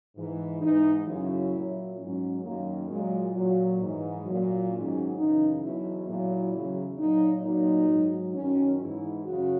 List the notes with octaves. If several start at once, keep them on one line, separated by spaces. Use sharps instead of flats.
G#2 E3
G#2 E3 D#4
F#2 C#3 F#3 E4
A#2 F#3
G#2 F#3 C#4
F#2 D#3 F#3 A#3
A#2 F#3 G#3
A#2 F#3
G#2 E3
F#3
A#2
G#2 D#3 F#3 C#4
F#2 C#3 E3 D#4
E2 B2 F#3 E4
A#2 F#3 E4
E2 C#3 F#3
A#2 F#3 D#4
A#2 F#3 D#4
G#2 F#3
F#2 D#3 F#3 C#4
G#2 E3 E4
F#2 C#3 F#4